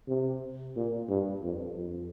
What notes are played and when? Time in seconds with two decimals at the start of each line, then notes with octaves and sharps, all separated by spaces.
0.08 C3
0.76 A#2
1.09 G2
1.43 F2
1.77 F2